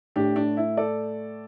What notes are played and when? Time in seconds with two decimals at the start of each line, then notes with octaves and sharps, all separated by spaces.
0.16 A2 A3 D4 G4
0.36 D4
0.57 E4
0.77 A4 D5